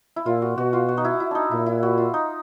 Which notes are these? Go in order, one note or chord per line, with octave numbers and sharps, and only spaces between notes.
E4
A#2 F4
F#4
B2 F#4
F4
F#4
D#4
E4
E4
D4 D#4
A#2 E4
E4
F#4
F4
D#4